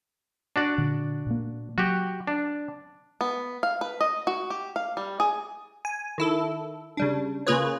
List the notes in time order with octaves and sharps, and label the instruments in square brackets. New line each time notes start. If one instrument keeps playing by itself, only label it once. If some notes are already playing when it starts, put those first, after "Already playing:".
[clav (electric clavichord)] D4 F#4 D5
[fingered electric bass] A#2 D3
A#2 A#3
[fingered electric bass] F#3 [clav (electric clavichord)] F#4 G4
[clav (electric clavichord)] D4
[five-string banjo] B3
F5
B4
D#5
F#4
G4
F5
G3
G#4
[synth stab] G#5
D#3 E4 A4
C#3 G3 D4
C#3 A#3 F4 G#4 B4 C#5